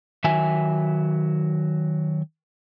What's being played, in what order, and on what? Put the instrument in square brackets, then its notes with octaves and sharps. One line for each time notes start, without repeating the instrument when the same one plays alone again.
[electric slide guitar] D#3 F#3 E5 G#5